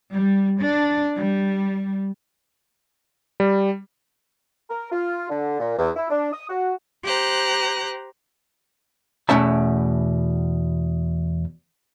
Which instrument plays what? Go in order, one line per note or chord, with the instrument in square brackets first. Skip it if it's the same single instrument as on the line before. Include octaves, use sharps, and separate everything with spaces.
[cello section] G3
D4
G3
[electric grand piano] G3
[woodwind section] A#4
F4
D3
A#2
E2
E4
D4
D#6
F#4
[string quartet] G4 C5 A#5 F#6
[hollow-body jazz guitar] E2 B2 A3 C#4 E5 A5